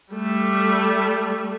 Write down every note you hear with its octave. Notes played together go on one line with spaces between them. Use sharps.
G3 A3